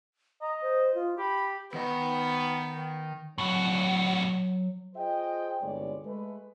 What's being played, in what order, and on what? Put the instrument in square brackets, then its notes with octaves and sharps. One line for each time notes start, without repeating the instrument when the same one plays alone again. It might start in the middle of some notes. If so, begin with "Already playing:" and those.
[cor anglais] D#5 [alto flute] A#5
[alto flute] C5
F4
[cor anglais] G4 [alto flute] B5
[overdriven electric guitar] D#3 D#5 [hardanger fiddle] B3
[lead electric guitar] A2 F#4 [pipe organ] F#3
[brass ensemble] F4 G#4 C5 D#5 G5
G1 C2 G3 G#3 C#5 D5
G#3 A3 B4